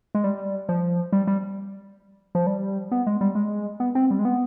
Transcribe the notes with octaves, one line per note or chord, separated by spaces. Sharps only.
G#3
G3
F3
G3
G3
F3
G3
B3
G#3
G3
G#3
B3
C4
G3
G#3
B3